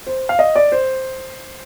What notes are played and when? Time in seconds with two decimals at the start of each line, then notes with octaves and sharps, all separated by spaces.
0.07 C5
0.29 F5
0.39 D#5
0.56 D5
0.72 C5